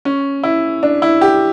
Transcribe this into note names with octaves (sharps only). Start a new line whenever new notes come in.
C#4
E4
D4
E4
G4